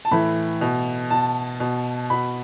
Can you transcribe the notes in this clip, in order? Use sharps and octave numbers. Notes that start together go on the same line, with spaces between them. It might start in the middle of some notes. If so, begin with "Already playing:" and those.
A5
A2 E3 B5
B2
B2 A5
B2
B2 B5